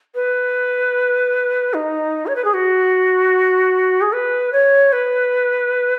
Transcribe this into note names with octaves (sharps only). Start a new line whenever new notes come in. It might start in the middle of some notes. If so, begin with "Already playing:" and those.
B4
D#4
C#5
B4
G#4
F#4
G#4
B4
C#5
B4